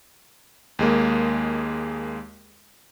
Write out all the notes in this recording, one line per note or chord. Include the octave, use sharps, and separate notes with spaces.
D#2 G#3 A#3